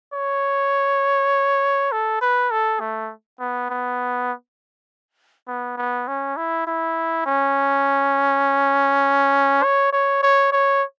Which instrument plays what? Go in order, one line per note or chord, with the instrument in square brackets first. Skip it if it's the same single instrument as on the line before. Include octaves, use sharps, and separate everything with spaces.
[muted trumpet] C#5
A4
B4
A4
A3
B3
B3
B3
B3
C#4
E4
E4
C#4
C#5
C#5
C#5
C#5